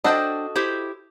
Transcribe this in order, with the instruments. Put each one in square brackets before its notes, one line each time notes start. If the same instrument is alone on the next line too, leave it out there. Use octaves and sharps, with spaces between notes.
[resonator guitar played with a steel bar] D4 C5 G5 [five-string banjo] F#4 A4 D#5
[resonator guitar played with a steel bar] E4 G4 C5